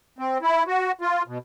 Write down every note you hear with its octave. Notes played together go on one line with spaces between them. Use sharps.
C4
E4
F#4
F4
B2